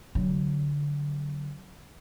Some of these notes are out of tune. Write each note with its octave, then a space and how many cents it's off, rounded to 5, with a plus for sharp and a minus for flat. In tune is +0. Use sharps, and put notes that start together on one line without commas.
D3 -20 F#3 +0